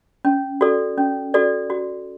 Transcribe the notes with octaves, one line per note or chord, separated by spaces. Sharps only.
C#4
F#4 A4 D5
C#4
F#4 A4 D5
F#4